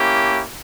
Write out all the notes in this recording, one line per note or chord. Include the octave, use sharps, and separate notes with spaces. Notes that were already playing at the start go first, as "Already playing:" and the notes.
Already playing: A#3 C#4 E4 G4